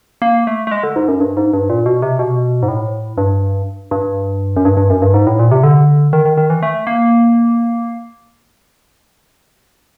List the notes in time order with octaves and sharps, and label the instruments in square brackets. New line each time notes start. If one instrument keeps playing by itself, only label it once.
[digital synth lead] A#3
A3
A3
G#3
D3
G#2
F#2
G2
G#2
G2
A#2
B2
C3
B2
G#2
A2
G2
G2
F#2
G2
G2
F#2
G2
G#2
A2
A#2
C3
D3
D#3
D#3
D#3
E3
A3
A#3